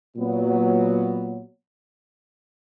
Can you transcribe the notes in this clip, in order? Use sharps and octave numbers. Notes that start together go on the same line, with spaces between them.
A#2 F#3 B3